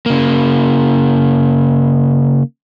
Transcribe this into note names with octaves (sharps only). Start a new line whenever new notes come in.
C#3 A#3